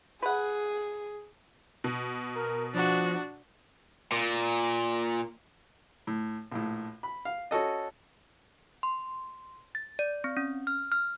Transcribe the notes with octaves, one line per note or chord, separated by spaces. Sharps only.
G#4 B4 F#5
B2
A#4
F3 D4 F#4
A#2
A2
A#1 A2
B5
F5
C#4 F#4 A4 D#5
C6
A6
D5
C4
C#4
F6
F6